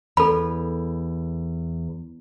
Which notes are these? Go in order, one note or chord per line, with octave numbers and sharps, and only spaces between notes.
E2 A4 B5